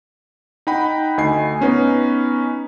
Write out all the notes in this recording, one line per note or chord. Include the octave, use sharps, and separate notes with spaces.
D#4 F#5 G5 B5
D2 D#5 G#5 C7
B3 C#4 D#4 B4